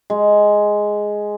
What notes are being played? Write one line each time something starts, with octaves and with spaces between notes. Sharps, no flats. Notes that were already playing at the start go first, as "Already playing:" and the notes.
G#3